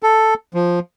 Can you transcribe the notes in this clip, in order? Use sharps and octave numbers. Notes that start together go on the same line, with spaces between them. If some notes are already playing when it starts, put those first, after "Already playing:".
A4
F3